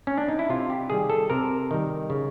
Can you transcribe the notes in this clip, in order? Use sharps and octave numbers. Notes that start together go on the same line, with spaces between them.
C#4
D4
D#4
E4
C3 F4
G4
D#3 G3 G#4
A4
C3 A#4
D#3 G3
C#3